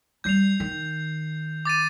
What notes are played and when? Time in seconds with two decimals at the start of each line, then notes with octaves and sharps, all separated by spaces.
0.24 G3 G6 C7 F7
0.60 D#3
1.65 D6 A6 D#7